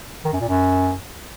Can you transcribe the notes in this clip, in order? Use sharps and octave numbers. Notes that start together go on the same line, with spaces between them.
D#3
F#2
A#2
F#2